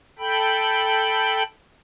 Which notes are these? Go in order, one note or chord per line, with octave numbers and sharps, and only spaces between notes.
A4 G5 B5